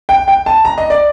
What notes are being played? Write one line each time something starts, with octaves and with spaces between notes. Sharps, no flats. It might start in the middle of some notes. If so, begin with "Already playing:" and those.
G5
G5
A5
A#5
D#5
D5